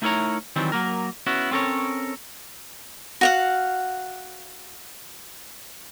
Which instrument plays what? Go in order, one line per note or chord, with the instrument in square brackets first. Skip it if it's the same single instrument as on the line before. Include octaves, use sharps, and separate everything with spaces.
[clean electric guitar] A3 D#4 E4 A#4 C#5 A#5
D#3 E3 F#3 G3 C4
F#3 A#3 A#4
B3 C#4 E4 F#4
C4 C#4 A4 A#4 C#5
[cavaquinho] F#4 F5 F#5